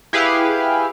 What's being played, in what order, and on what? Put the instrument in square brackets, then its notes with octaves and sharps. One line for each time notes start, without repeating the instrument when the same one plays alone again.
[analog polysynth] E4 G4 G#4 B4 F5